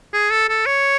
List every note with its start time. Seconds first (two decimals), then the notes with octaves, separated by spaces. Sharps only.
0.13 G#4
0.31 A4
0.49 A4
0.66 C#5